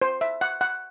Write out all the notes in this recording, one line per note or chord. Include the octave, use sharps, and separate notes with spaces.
C5
E5
F#5
F#5